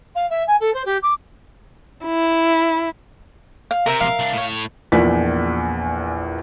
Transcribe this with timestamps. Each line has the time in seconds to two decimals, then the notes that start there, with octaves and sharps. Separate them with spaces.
0.15 F5
0.30 E5
0.47 G#5
0.60 A4
0.74 C5
0.85 G4
1.02 D6
2.05 E4
3.71 F5
3.86 C3 A#4 E5
4.01 F5
4.19 C2 D4
4.34 A2 C#5
4.92 A#1 E2 F3 A#3 D5 B6